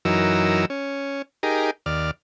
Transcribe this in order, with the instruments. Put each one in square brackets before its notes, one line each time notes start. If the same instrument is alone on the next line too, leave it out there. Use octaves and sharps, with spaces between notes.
[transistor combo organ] F#2 E3 F#3 D#4 A#4 E6
C#4
D#4 G4 G#4 A#4
D#2 D5 F6